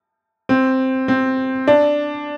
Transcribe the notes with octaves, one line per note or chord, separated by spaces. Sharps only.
C4
C4
D4